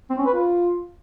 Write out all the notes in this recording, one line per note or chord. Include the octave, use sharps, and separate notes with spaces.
C4
C#4
B4
F4